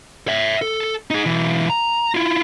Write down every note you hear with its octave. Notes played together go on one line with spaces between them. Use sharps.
C#5 E5
A4
D#4 G#4
B1 E3
A#5
E4 F4